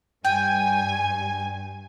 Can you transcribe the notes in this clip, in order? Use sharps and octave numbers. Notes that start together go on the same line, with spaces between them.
G2 G5 G#5